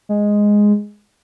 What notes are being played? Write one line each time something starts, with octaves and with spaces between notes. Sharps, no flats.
G#3